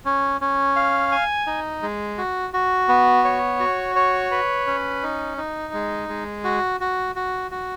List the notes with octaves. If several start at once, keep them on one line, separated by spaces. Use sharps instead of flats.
C#4
C#4
F5
G#5
D#4
G#3
F#4
F#4
B3
C#5
F#4
C#5
B4
C#4
D#4
D#4
G#3
G#3
F#4
F#4
F#4
F#4